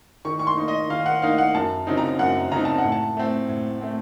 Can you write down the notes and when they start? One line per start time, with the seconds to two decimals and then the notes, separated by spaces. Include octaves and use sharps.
0.25 D#3 C#6
0.39 C#6
0.47 C6
0.57 A#3 D#4
0.68 D#5
0.90 D#3 F5
1.06 F#5
1.22 A#3 D#4 F5
1.38 F#5
1.54 F#2 A5
1.87 C#3 F#3 C4 D#4
1.98 A#5
2.19 F#2 F#5
2.51 C#3 F#3 C4 D#4 A#5
2.65 A5
2.78 F#5
2.84 A2
2.92 A5
3.17 A3 C4
3.49 A2
3.81 A3 C4